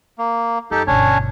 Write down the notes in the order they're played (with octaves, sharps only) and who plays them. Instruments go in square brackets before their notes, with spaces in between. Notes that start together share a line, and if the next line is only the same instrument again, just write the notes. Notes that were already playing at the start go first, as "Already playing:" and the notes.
[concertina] A#3
[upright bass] F#2 [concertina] D#4 G4 A4
[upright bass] G1 B2 [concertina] C#4 D4 C#5